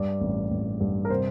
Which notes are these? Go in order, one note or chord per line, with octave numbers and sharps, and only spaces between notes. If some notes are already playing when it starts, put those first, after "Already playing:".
Already playing: G2 D5
A1
A1
G2
A#4
C3 C5